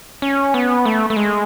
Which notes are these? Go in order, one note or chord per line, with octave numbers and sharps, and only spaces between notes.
C#4
B3
A3
A3
G#3